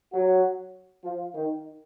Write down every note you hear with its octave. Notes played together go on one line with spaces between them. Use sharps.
F#3 F#4
F3 F4
D#3 D#4